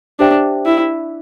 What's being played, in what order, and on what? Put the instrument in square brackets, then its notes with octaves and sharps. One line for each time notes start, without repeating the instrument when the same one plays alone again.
[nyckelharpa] D4 [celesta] G4 C5 E5 G5
[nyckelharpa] E4